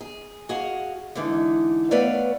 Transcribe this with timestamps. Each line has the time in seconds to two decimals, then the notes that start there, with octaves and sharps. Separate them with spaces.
0.01 G#4
0.49 F#4 G#4 D#5 F5
1.15 D3 E3 G#3 D#4
1.91 A3 B3 B4 C#5 D5 F5